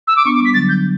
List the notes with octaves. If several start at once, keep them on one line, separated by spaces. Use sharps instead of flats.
E6
D6
B3 D4 C#6
D6
G3 B3
B6
D3 F#3 A6
G6